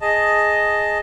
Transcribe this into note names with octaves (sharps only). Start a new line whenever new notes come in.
G#4 D#5 A5